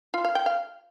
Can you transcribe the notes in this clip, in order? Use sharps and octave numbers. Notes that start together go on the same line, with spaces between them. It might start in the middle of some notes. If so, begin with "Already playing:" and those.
F4
F5
G5
F5